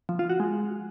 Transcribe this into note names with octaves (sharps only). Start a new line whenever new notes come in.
F3
F4
F#4
G#3